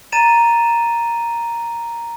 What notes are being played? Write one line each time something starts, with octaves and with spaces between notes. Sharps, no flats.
A#5 A6 D#7 E7